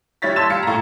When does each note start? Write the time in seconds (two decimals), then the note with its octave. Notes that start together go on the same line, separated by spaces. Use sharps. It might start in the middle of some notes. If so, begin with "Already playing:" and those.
0.22 G3 E4 C#5 A6 B6
0.36 A5 C6 E6 G#6 A6 E7
0.50 G3 F5 C#7
0.63 A2 A#5